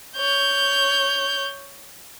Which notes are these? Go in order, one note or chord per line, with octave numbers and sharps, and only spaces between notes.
C#5 G6